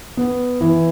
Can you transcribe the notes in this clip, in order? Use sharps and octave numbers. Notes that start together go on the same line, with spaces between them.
B3
E3